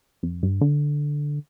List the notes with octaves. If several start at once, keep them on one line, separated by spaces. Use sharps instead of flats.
F2
G2
D3